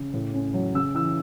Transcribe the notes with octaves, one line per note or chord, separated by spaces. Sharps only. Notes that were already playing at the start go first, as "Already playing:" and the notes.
Already playing: C#3
A2
C#4
F#3
C#3 E6
E3 E6